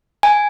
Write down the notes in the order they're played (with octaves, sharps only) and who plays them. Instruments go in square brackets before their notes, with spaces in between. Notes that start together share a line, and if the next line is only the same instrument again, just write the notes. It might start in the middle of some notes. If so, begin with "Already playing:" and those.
[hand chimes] G#5